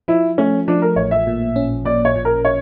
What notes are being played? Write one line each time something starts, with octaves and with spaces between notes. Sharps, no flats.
F3 E4
A3 C#4
F3 D4
A#4
A1 C#5
E5
A#2
C#4
A#2 D5
C#5
A#2
A#4
C#5